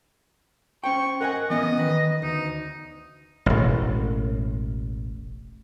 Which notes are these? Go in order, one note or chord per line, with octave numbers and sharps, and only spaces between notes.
C#4 C5 G5 C#6
A#4 D#5 F#5 G#5
E3 B3 C#4 D#5
D#3 B4
D2 D#4
E1 A1